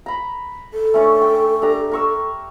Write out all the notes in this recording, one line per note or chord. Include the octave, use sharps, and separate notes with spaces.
A#5 B5
A4
A3 C#4 D4
G5
D4 G4 A#5
A#4 C#6 E6